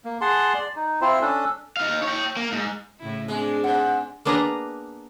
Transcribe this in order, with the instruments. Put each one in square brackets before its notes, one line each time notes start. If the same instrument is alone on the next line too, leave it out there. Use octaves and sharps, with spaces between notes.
[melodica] A#3
G#4 F#5 A5 C6
D5
D#4
C4 E4 F4 C5
C#4 D4 A4
[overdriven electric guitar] D#4 F5
C#5 G5
A#3
G#2
[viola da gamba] A2 C#3 E4
[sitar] G#3 [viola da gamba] C4 D4
[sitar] G#2 [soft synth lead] F#5
[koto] A#3 B3 D4 G#4 B4 A#5